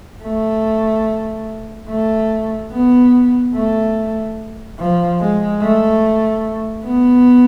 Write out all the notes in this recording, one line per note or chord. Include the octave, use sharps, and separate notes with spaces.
A3
A3
B3
A3
F3
G#3
A3
B3